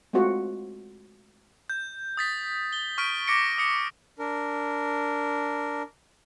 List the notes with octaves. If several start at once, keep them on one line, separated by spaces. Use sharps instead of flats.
G#3 A3 C4 F4 F#4 C5
G6
D#6 A6 B6
G7
C#6 F6 B6 D7
D6 A#6 C#7 D7
D#6 C#7
D4 A#4